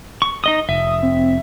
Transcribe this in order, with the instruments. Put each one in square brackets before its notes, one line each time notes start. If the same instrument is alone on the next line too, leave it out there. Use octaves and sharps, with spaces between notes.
[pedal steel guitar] C#6
D#4 D#5 D#6
[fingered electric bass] F1 [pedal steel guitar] E5 [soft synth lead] D#6
[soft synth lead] C4